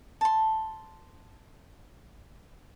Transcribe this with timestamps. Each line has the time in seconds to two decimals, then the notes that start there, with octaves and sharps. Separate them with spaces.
0.21 A5 C6